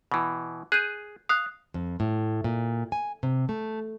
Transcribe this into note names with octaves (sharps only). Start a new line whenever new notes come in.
B2 E3
G#4 F#6 G6 D#7
F5 D#6 F#6
F2
A2
A#2
G#5
C3
A3